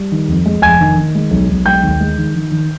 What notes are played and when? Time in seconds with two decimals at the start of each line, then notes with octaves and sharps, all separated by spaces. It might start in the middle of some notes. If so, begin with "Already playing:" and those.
Already playing: G3
0.12 D#3
0.28 F2
0.46 G#3
0.62 F1 G#5 G#6
0.80 D#3
0.98 D#3
1.15 G#3
1.31 B1
1.49 B1
1.65 G#3 G5 G6
1.83 D#2
2.00 G#3
2.18 D#3
2.35 D#3
2.51 D#3